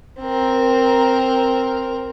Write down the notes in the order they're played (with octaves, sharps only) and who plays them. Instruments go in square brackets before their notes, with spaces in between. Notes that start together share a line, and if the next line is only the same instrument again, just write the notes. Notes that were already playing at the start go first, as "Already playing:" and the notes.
[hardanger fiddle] C4 A#4